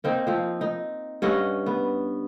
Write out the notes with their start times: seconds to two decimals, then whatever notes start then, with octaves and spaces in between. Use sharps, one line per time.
0.04 A#3 C4 D#4
0.27 F3 C4
0.61 D#4
1.22 G2 C#4 D#5 F#5
1.66 B3